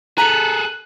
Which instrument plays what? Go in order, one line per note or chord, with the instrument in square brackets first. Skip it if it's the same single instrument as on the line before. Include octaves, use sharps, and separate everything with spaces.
[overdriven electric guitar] G#4 A4 [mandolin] A#5 B5 [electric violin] F#6